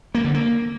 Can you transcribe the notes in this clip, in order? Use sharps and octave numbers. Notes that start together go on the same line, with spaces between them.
A#3
D3
A#3